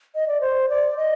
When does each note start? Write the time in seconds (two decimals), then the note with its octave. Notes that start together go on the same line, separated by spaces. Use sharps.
0.15 D#5
0.28 D5
0.41 C5
0.69 D5
0.97 D#5